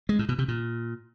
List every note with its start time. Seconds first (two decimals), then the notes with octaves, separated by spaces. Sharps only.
0.09 G#3
0.19 A2
0.29 B2
0.38 C3
0.48 A#2